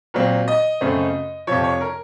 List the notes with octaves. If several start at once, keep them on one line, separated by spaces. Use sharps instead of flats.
A#2 F#3 C4
D#5
F#2 C#3 A3 C4
F2 C3 F3 C#5
C#5
A#4